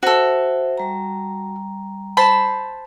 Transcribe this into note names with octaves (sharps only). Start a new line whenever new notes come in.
F#4 A4 C5 E5
G3 A#5
C5 A5 B5